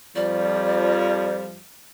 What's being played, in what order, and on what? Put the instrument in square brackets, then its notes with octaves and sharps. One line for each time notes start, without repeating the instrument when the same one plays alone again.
[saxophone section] F2 F3 G3 [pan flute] D5